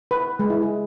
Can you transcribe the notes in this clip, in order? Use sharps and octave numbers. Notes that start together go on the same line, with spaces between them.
B4
G#3
E4
G#4